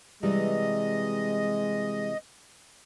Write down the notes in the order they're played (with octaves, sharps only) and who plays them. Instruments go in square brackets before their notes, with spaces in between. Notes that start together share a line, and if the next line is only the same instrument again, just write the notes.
[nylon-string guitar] C3 E3 G3 [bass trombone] G#3 [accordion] D#5